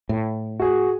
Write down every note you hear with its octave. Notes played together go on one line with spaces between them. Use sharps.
A2
F#4 G#4